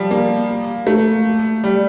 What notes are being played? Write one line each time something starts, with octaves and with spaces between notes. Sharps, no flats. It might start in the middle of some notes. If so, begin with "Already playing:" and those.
Already playing: F3 G3
A#3
A3
G3